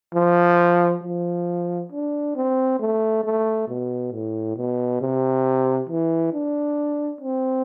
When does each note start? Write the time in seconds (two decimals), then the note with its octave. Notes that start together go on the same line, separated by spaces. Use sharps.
0.15 F3
1.04 F3
1.92 D4
2.36 C4
2.80 A3
3.24 A3
3.68 B2
4.12 A2
4.57 B2
5.01 C3
5.89 E3
6.33 D4
7.21 C4